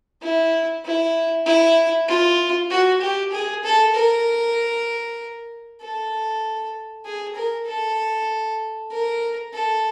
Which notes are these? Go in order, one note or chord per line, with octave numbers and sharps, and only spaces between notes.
E4
E4
E4
F4
F#4
G4
G#4
A4
A#4
A4
G#4
A#4
A4
A#4
A4